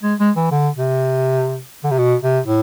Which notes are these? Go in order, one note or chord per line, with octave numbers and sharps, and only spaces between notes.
G#3
G#3
E3
D3
C3
D3
C3
B2
C3
A2